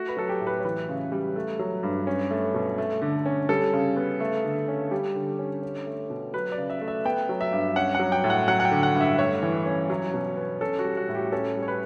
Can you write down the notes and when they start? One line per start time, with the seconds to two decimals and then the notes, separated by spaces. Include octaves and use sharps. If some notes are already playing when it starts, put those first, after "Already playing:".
Already playing: A3 F#4
0.08 B4
0.17 F#3 A4
0.29 G4
0.41 A2
0.47 B4
0.60 C#5
0.65 E3 B4
0.89 C#3
1.12 G3
1.36 A3
1.59 F#3
1.83 G2
2.07 C#4
2.31 A3
2.54 B2
2.78 A3
3.02 D3
3.26 C#4
3.49 G3 A4
3.73 C#3
3.96 B3
4.20 A3
4.45 D3
4.68 C#4
4.91 G3 G4
5.15 D3
5.39 C#4
5.63 C#4
5.86 A3
6.10 B2
6.34 F#3 B4
6.52 D5
6.58 C#3
6.70 E5
6.81 A3
6.88 E5
7.05 B3 G5
7.29 F#3
7.41 E5
7.52 G2
7.76 C#4 F#5
7.95 F#3 F#5
8.12 G5
8.24 A2
8.30 F#5
8.48 F#3 F#5
8.60 F#5
8.65 G5
8.71 D3
8.83 F#5
8.95 G2
9.01 E5
9.19 A3 C#5
9.43 E3
9.66 C#4
9.90 F#3
10.14 B2
10.37 B3
10.61 C#4 A4
10.79 F#4
10.85 G3
10.97 F#4
11.09 A2
11.15 G4
11.32 C#4 A4
11.56 G3
11.62 C#5
11.68 B4